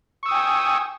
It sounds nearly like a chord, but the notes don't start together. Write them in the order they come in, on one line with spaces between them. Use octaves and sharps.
C#6 E6 D#6 G5 G#5